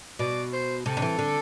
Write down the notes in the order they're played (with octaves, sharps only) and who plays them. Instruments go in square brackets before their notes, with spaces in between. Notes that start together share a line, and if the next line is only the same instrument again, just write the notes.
[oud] B2 [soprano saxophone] D5
[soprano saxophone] C5
[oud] C3 [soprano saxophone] A4
[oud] D3
E3
D3